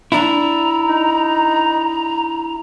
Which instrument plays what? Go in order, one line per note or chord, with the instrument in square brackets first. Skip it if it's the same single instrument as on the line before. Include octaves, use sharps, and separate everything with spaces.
[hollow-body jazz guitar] D4 E4 [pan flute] A#5
[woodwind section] D#4